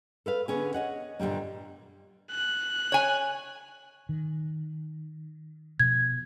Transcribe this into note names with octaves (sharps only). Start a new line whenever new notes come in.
A4 B4 F5
D3 B3 C#4 G#4
C#5 D#5 F#5
G2 A#2 D3 G3 A#3
F#6
C#5 G#5
D#3
B2 F3 G#6